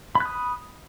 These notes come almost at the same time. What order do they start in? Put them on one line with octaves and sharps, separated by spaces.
B5 F#6 D#6